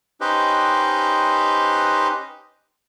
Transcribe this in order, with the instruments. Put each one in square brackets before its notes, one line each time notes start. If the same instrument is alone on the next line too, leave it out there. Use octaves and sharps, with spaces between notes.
[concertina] C#4 D#4 G4 B4 C5 D#5